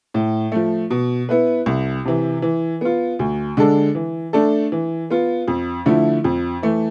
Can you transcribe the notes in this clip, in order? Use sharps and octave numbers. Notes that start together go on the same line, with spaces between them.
A2
F3 A3
B2
B3 E4 B4
C2
C3 E3
E3
B3 F4
D2
D3 G#3 D4 A4
E3
A3 D4 A4
E3
B3 F4
F2
D3 F3 A3 E4
F2
E3 A3